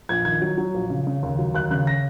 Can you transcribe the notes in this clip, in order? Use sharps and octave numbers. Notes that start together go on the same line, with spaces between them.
A#1 G#6
D#3 G#6
F#3
F#3
A#1
C#3
C#3
D#2
F#3
D#2 F#6
C#3 F#6
A#6